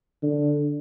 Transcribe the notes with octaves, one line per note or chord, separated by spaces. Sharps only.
D3